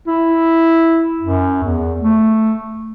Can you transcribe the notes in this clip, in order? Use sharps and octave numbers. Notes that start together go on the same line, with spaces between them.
E4
F#2
E2
A3